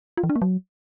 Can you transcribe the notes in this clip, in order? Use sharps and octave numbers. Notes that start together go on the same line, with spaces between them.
F4
E3
D4
A#3
F#3